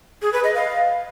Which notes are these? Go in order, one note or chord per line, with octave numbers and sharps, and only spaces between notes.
G#4
B4
D#5
F5